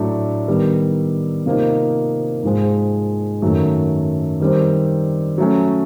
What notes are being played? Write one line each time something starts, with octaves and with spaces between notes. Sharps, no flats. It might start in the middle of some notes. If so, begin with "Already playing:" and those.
Already playing: A2 F#3 A3 D4
D#3 G3 B3
C3 F3 A#3 D#4
G#2 F3 G#3
F#2 D#3 F#3 A3
D#3 G3 C4
F#3 A3 C#4